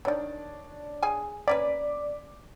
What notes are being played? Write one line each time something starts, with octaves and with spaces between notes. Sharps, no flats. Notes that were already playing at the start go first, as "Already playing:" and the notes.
D#3 E3 D4 C#5 D5
G#4 G#5
A#3 C#4 B4 D5 D6 B6